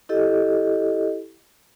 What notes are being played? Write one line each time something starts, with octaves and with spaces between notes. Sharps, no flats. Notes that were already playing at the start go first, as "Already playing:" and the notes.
E4 G4 A4 D#5